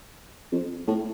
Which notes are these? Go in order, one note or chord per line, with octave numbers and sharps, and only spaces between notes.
F2
A2